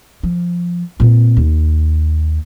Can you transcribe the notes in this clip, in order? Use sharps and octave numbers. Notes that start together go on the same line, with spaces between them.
F3
A#2 C4
D#2